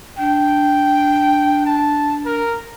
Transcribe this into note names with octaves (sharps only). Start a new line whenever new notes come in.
D4 G5
A5
A#4